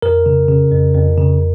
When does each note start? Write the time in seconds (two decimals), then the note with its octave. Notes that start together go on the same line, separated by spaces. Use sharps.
0.02 F2 A#4
0.26 C#3
0.49 C#3
0.72 F2
0.95 F2
1.17 C#3